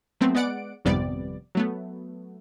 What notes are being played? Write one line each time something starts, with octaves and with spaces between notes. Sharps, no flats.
F#3 A3 B3 C4
G#3 B3 D5 F#5 D7
G#1 F2 C3 G3 B3 D5
F#3 A3 B3